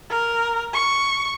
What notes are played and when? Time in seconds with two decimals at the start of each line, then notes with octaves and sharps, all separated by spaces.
0.10 A#4
0.74 C#6